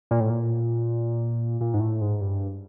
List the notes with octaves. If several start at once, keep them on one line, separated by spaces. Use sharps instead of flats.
A#2
A2
A#2
A#2
G#2
A2
G#2
G2